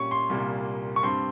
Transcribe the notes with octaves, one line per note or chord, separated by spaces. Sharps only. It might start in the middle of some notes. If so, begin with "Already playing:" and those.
Already playing: A#2 G3 C#4 C#6
C6
C2 A#2 G3 A#3
C#6
G2 G3 C4 C6